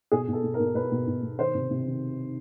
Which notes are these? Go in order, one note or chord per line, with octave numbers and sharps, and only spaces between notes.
B2 G#4
B2 A4
B2
A#4
B2
B2 B4
B2
B2
B2
D#3 C5
C3
C3
D#3